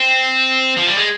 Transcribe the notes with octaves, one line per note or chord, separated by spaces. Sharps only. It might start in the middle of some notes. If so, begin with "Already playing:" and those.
Already playing: C4
F3
G3
G#3